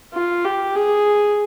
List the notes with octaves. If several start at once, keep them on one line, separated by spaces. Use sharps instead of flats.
F4
G4
G#4